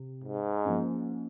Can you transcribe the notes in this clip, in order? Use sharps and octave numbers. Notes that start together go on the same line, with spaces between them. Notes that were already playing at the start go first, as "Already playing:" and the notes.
Already playing: C3
G#2
F3 A#3 C#4